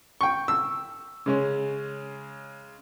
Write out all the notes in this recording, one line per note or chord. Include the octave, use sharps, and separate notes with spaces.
G5 C#6
E6
C#3 G#3 C#4